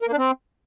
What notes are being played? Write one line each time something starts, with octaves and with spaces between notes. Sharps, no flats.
A#4
A#3
D4
C4